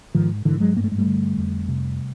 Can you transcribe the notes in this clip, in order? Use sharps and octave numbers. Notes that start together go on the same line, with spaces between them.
G#2 D#3 F3
G#2 D3 E3
F#3 G#3
G2 A#3
A3
G#3
G3 A3
D3
F2
C3